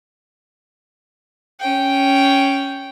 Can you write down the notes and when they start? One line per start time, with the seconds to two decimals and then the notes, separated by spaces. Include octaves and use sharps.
1.60 C#4 G5